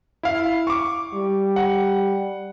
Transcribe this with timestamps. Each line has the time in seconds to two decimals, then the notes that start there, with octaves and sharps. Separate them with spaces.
0.23 E4 F5
0.67 C#6 D6
1.14 G3
1.56 F#5